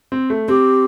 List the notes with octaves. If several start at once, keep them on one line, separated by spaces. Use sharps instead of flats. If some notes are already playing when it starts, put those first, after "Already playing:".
C4
A3
C4 G4